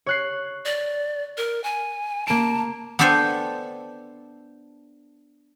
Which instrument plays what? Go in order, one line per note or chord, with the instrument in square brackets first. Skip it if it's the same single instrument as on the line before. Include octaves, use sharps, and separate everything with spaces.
[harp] C#5 F#6 C7
[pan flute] D5
A#4
G#5
[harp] A#3 D7 [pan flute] A5
[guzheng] B3 D4 A4 C5 G5 G#5